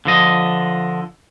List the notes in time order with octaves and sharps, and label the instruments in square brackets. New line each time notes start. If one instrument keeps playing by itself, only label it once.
[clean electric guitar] D3 F3 D#5